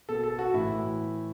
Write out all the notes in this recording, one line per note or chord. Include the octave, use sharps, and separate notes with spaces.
B2 A4
A4
F#4
A2 E3 E4